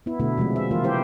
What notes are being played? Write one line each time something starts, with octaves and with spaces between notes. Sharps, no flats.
B3 E4
B2 D3 A3 E4
C3 F3 G#3 A3
E5
E3 A#3 F4
C4 E4 G4 C5